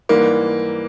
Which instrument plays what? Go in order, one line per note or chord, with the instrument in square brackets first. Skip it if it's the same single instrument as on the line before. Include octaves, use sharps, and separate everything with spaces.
[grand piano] G#2 E3 G3 A#3